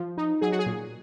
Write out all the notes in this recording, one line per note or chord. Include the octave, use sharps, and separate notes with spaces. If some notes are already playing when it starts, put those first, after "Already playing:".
Already playing: F3
D#4
F#3 G#4
F#4
G#4
A#2